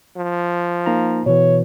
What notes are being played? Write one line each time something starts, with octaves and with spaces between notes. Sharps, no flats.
F3
A#3 D#4 A#5
B2 E3 C#5